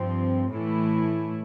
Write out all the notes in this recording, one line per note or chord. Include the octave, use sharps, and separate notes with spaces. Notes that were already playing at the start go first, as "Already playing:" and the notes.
Already playing: G2 F3 C4
A2 E3 A3 E4